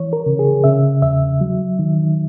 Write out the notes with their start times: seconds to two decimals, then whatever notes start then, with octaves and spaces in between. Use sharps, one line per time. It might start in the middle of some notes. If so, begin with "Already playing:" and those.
Already playing: E3 C#5
0.13 A#4
0.26 C#3
0.39 G#4
0.64 C#3 E5
1.02 E2 E5
1.41 F#3
1.79 D#3